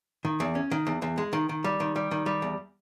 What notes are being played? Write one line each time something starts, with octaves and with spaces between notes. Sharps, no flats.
D#3
E2
C#4
D#3
E2
E2
G#3
D#3
D#3
G3
D#3
G3
D#3
G3
E2